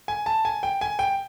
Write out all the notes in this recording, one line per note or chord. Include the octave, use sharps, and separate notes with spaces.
G#5
A5
G#5
G5
G#5
G5